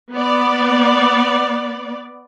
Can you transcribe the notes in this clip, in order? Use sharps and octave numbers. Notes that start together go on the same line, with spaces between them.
B3 D5